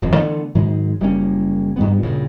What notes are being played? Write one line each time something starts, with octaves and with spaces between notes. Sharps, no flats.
D#1 F2
D3 E3 A3 B3
G#2 D#3 F#3 G#3
F#1 G3 A#3 C#4
G2 G3 B3
D2 G2 A#2 C#3